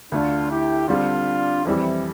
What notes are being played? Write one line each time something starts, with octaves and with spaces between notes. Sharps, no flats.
D2 D3 A3 D4 F4
E4 G4
D3 G3 C4 D4 F4
F2 E3 G3 C4 E4